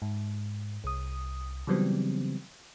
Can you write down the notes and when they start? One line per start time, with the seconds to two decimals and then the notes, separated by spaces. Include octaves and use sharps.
0.02 G#2
0.84 C2 D#6
1.67 C#3 E3 F#3 G3 B3 C4